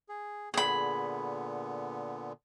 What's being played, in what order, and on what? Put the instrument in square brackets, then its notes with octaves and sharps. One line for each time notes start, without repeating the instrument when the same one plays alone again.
[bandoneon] G#4
[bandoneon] A#2 D3 B3 [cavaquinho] G#4 B5